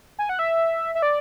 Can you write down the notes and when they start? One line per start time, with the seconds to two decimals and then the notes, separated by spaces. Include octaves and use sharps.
0.19 G#5
0.29 F#5
0.39 E5
0.95 E5
1.02 D5